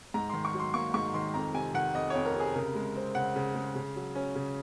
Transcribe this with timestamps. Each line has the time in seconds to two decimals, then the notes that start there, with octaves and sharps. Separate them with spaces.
0.14 G#2 A#5
0.30 D#3 C6
0.45 C#6
0.54 F#3
0.60 C6
0.74 A#3 C#6
0.94 G#2 C#6
1.14 D#3 C6
1.34 F2 A#5
1.54 C3 G#5
1.74 D#3 F#5
1.95 F2 D#5
2.10 F2 C#5
2.25 A#4
2.35 C3
2.40 G#4
2.54 C#3 A#4
2.75 G#3
2.96 C4
3.15 C#3 F#5
3.36 C#3
3.55 G#3
3.76 C#3
3.96 F#3
4.15 C#4
4.35 C#3